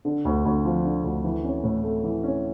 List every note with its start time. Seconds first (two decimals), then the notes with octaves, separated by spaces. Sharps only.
0.05 D3
0.25 D2
0.45 D2
0.65 F3
0.84 D3
1.04 D2
1.24 E3
1.44 C#4
1.64 A2
1.84 A3
2.04 E3
2.23 C#4